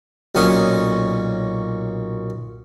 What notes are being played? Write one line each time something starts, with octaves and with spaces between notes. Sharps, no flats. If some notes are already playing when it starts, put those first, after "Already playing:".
B1 A#2 C#4 D#6